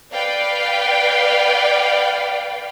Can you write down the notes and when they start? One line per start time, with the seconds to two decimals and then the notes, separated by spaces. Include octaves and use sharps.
0.12 B4 D5 F5 G5